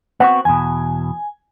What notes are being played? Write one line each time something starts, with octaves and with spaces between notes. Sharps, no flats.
B3 C4 F#4 F#5
E2 B2 G#5